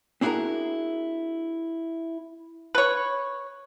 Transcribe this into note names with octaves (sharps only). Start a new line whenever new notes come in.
C4 D4 E4 F#4 G#4 A#4
B4 C#5